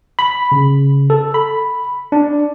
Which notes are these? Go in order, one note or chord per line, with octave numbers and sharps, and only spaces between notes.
B5
C#3
A4
B5
D4